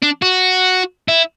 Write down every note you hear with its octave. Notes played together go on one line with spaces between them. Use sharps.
D4
F#4
E4